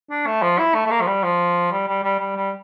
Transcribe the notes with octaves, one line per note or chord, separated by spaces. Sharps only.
D4
A3
F3
E4
A3
A3
A#3
F3
G3
F3
G3
G3
G3
G3
G3